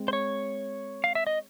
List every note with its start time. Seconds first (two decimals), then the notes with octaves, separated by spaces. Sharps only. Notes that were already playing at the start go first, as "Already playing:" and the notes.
Already playing: G#3 C4
0.08 C5
0.13 C#5
1.04 F5
1.15 E5
1.27 D#5